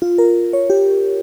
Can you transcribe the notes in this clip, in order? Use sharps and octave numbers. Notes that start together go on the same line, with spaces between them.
F4
A#4
C#5
G4